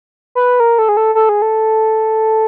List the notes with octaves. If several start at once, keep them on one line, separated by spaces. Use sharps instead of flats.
B4
A#4
A4
G#4
A4
A4
G#4
A4